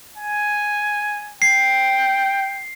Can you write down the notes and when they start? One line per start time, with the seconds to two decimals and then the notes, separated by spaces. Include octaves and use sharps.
0.18 G#5
1.42 G5 C7